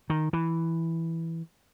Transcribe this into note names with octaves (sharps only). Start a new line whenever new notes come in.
D#3
E3